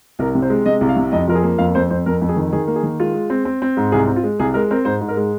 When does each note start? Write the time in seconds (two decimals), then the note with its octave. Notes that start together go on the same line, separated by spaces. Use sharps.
0.19 C2 A#4
0.35 C3
0.42 C5
0.50 G#3
0.66 C3 D#5
0.81 C2
0.89 F5
0.96 C3
1.12 F2 D#5
1.28 F3 A#4
1.35 G#4
1.43 A#3
1.58 F2 F5
1.75 F2 C5
1.90 F2 C5
2.06 F2 A#4
2.21 F2
2.29 G#4
2.36 D#3
2.53 D#3 G#4
2.67 A#3
2.76 G#4
2.83 D#3
3.00 G#3 F4
3.14 G#3
3.30 C4
3.45 C4
3.62 C4
3.77 G#2
3.92 C2 G#4
4.07 C4
4.16 F4
4.23 G#3
4.39 C2 G#4
4.54 G#3 A#4
4.71 C4 A#4
4.85 G#2 C5
5.01 G#2
5.09 A#4
5.17 G#3